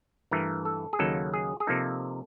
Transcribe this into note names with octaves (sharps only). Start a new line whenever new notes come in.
G2 E3 A3 A#4
A4
G#4
D#2 C#3 F#3 A#3 D#4 A4
G#4
G#4
C3 F3 A#3 D#4 A4